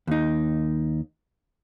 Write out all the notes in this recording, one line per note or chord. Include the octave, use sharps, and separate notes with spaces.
D#2 D#4